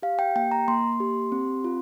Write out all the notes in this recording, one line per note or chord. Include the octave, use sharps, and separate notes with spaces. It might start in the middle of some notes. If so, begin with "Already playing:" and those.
G4 F5
G5
A#3 G5
A#5
A#3 C6
G4
C4
F4